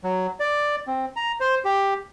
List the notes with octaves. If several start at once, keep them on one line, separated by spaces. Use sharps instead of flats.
F#3
D5
C4
A#5
C5
G4